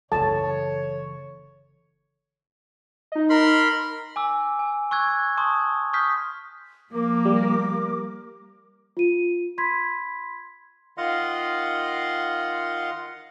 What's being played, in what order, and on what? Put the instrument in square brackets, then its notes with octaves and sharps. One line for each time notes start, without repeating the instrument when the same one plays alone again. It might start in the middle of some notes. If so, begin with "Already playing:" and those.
[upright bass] F#1 E3 [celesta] A4 [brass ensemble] C#5 [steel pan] A5
[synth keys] D#4 D#5
[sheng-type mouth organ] A#4 B5 C6
[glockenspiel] G#5 D6 E6
G#5
C#6 E6 F#6 G#6
A5 C6 C#6 D#6
C#6 D#6 F6 G6 B6
[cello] F3 A#3 [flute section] A#4 D6
[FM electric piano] G3
[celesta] F4 D#7
B5 C6 G#6 B6
[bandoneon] D#3 F4 D#5 F5 F#5 C6